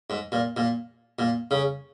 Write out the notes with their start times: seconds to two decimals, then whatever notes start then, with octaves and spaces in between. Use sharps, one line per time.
0.10 G#2
0.32 A#2
0.57 A#2
1.19 A#2
1.51 C#3